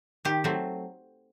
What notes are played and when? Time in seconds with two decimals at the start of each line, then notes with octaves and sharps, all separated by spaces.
0.25 D#3 G4
0.44 F#3 A3 C4